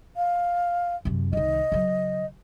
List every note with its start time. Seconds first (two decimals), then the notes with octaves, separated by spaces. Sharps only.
0.17 F5
1.05 F#2 C3
1.33 C2 D#3 D#5
1.72 C#3 F#3